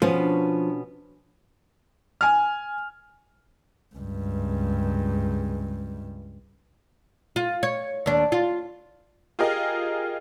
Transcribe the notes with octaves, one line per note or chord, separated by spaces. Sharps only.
B2 F3 B3 C#4
D4
G#5 F6
C#2 G2
F4
C#5
D#2 D4
F4
F4 G4 G#4 A#4 D#5